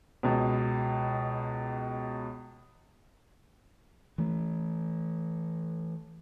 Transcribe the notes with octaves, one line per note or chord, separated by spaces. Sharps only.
C#2 B2
E3 A3